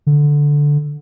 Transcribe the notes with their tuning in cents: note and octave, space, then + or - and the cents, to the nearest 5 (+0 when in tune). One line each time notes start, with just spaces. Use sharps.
D3 -5